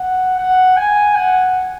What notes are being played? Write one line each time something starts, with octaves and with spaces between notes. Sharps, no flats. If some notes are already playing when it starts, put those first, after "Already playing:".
Already playing: F#5
F#5
G#5
F#5